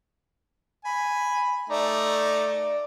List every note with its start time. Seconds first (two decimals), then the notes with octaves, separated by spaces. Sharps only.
0.85 G#5 B5
1.70 A3 D#4 D5